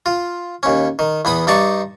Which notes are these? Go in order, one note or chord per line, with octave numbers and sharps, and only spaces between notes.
F4
D#2 C#4
D#3
E2 B3 B5 D#6
G2 D#4 D5 A5 C#6